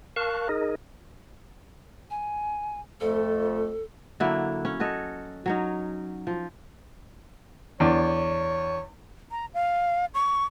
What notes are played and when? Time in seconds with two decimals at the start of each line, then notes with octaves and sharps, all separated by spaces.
0.16 A#4 F5 A5 C#6 F#6
0.49 D#4 G#4 A#4 D#5
2.10 G#5
3.00 F2 A3 A4
4.20 D3 F#3 A#3 E4
4.65 C#4
4.80 F#4 A4 C#5 D#5
5.46 F#3 C#4 D#4
6.27 F3
7.80 E2 D4 C#5 D6
9.31 A#5
9.54 F5
10.14 C#6